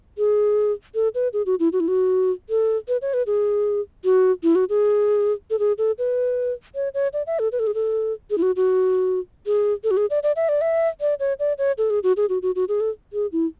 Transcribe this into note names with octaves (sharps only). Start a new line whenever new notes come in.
G#4
A4
B4
G#4
F#4
E4
F#4
E4
F#4
A4
B4
C#5
B4
G#4
F#4
E4
F#4
G#4
A4
G#4
A4
B4
C#5
C#5
D5
E5
A4
B4
A4
G#4
A4
G#4
E4
F#4
F#4
G#4
A4
F#4
G#4
D5
D5
E5
D5
E5
D5
C#5
D5
C#5
A4
G#4
F#4
G#4
F#4
F#4
F#4
G#4
A4
G#4
E4